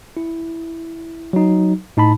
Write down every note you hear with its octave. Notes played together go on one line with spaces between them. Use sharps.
E4
F#3 D#4
A2 D#4 A5 B5